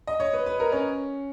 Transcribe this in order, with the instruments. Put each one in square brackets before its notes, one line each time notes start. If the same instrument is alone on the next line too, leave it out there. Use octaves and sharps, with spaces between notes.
[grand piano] D#5
C#5
B4
B4
A#4
C#4